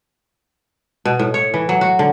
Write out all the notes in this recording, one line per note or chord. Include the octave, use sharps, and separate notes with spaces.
B2
A2
C#5
E3
F#3
F#4
D3